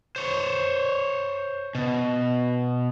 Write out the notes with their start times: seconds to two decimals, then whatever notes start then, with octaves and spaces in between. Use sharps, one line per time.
0.16 C5 C#5
1.75 B2